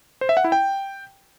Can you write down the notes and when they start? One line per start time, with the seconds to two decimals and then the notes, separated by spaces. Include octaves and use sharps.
0.21 C5
0.29 E5
0.37 F#5
0.44 E4
0.52 G5